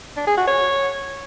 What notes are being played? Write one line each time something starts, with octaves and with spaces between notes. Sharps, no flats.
D4
G#4
F#4
C#5